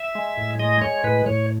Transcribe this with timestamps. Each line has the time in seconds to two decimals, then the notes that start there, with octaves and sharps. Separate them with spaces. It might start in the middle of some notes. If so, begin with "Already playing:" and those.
Already playing: E5
0.15 G#3
0.37 A2
0.59 G#3 D#5
0.81 G#3 C#5
1.04 A2 B4
1.26 A2 C#5